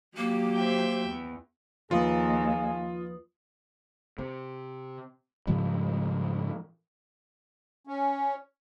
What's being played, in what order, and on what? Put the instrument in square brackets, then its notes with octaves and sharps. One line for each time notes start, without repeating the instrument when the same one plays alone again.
[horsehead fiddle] F#3 G4 [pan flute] A#3
[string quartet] C5 E5 G5
E2
[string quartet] D#2 [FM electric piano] F3 B4 D#6 [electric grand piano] F4 [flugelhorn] G#4
[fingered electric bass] C3
G#2 C#3 F3 G3
[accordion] C#4